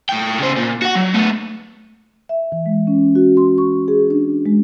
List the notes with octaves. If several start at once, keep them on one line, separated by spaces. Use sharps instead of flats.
A2 G5
C#3 C5
A#2
F#4 F#5
F#3
A3 B3
E5
E3
G#3
C#4
F#4
C6
C#6
G#4
D4
G#3